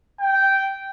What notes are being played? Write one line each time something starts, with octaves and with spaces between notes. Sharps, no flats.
G5